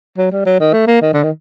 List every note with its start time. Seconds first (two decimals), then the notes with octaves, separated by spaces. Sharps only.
0.17 F#3
0.32 G3
0.46 F#3
0.60 D#3
0.73 A3
0.87 A#3
1.02 D#3
1.13 D3
1.24 D#3